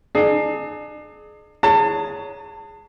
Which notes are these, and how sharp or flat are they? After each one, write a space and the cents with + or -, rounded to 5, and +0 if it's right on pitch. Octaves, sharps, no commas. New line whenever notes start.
D4 +40 G#4 +30
G#4 +0 C#5 +15 A5 +30